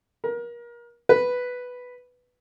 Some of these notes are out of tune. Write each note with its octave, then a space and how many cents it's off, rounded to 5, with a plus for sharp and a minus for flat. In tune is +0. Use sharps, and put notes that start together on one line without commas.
A#4 +30
B4 +0